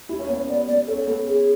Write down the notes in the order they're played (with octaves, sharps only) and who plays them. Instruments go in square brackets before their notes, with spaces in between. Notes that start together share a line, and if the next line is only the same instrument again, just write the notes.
[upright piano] E4
C#4
[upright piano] B3 [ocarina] C#5
[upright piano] C#4
[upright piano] B3 [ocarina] D5
[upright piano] B3 [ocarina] D5
[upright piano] C#4 [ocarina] A4
[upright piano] B3 [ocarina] A4
[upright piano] C#4 [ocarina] G#4